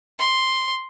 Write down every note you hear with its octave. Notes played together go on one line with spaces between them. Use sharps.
C6